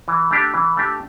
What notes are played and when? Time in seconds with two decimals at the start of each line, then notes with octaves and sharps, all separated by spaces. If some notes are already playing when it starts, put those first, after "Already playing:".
0.08 E3
0.31 A3 D4 G4
0.54 E3
0.77 A3 D4 G4